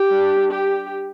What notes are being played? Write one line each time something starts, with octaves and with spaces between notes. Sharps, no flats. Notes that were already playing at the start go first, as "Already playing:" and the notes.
Already playing: G4
G3 D4
G4